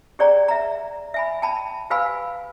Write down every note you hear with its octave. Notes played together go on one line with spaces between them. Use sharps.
G4 G#4 C#5 D5 G5 A#5
E5 A#5
E5 G#5 B5
G5 A5 B5
G4 B4 F5 G#5 B5 E6